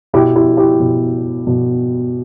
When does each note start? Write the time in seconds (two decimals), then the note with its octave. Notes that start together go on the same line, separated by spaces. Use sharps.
0.13 B2 E4 G4
0.36 E4 G4
0.57 E4 G4
0.80 B2
1.47 B2